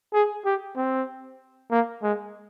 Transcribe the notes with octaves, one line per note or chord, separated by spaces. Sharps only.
G#4
G4
C4
A#3
G#3